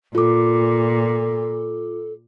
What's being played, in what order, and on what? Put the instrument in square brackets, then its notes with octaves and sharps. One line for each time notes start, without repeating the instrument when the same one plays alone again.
[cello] A#2 [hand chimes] F4 D6 [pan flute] A4